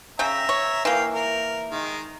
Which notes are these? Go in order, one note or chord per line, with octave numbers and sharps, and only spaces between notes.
C#3 E5 G5 A#5
C#5
E3 A#3 F5 G5
A#4
D#3 G#3